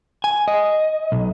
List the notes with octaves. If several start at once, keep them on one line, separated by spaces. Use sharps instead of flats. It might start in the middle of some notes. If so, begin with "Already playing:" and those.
G#5
D#5
B1